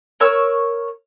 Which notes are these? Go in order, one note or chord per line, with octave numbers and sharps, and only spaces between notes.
A#4 C#5 C#6 E6